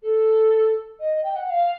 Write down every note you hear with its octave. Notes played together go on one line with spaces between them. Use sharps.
A4
D#5
G5
F#5
F5